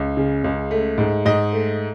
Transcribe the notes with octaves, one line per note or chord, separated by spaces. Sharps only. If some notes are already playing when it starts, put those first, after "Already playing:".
Already playing: C#2
C#3
C#2
A3
G#2
G#2 D#5
A3